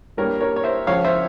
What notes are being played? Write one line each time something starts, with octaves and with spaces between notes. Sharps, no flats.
G2 G3 A#3 A#4 C#5
A#4 C#5
C#5
C5 E5
C#2 C#3 F3 C#5 F5
C5 E5